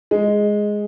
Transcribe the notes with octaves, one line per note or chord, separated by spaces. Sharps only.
G#3